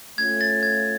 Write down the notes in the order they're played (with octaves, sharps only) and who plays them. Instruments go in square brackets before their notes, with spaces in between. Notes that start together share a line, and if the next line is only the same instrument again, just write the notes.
[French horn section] A3 C#4 F4 [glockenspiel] G#6
[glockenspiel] A6
G#6